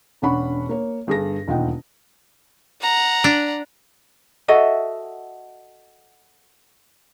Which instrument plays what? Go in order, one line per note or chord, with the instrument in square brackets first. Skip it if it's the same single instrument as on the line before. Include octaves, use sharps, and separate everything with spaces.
[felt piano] E1 C#4 D4 F#5 B5 C#6
A#3 C#5
G1 G2 G#4 A4 A#6
E1 D#2 F4 D#5 F#5 G5
[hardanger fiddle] F#5 A#5
[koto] D4
[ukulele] F#4 A4 D#5 E5